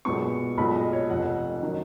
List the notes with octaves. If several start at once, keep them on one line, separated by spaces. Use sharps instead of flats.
B1 A#2 G#3 B3 C#6
B1 A#2 G#3 B5
D#5
C#5
F1 F2 F3 F#5
D#3 F#3